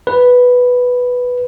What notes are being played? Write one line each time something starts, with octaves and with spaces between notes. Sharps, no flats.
B4